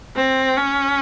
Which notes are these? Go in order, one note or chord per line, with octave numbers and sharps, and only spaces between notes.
C4
C#4